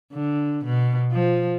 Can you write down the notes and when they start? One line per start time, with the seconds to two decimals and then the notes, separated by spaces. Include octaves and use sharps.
0.13 D3
0.65 B2
1.11 F3